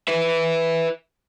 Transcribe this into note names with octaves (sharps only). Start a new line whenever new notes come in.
B4 E5